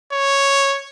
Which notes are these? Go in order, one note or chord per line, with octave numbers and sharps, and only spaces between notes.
C#5